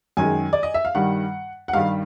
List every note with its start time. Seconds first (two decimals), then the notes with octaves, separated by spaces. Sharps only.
0.17 F#2 D#3 G#3 G#5
0.53 D5
0.63 D#5
0.74 E5
0.85 F5
0.95 G2 D#3 G3 F#5
1.68 F#5
1.73 G2 D#3 G3 F5